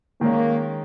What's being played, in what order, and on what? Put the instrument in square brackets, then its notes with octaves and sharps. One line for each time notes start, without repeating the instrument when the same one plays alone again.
[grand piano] D#3 G#3 C#4 [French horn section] A#3